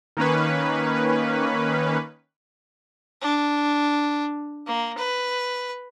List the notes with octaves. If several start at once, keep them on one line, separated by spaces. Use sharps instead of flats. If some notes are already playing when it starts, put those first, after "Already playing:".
D#3 A#3 C#4 B4
D4
A#3
B4